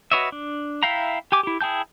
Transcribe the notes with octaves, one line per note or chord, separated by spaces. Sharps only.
F#4 B4 C#5 D#5 E5
D4
E4 E5 F5 G5 A#5
G4 G#5 D6
E4 G4
E4 G#4 G5 A5 G6